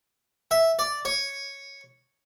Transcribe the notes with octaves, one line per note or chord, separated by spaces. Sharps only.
E5
D5
C#5